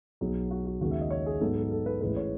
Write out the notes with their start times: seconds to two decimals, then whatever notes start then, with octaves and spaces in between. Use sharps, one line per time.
0.21 B1 B2 F#3 G#4
0.51 F#4
0.66 F#4
0.81 D#2 C#3 G#3 F#4
0.91 E5
1.01 D#5
1.11 C#5
1.26 G#4
1.41 G#2 F#3 B3 D#4 A4
1.56 A4
1.71 A4
1.86 B4
2.01 A1 A2 G#3 B4
2.17 C#5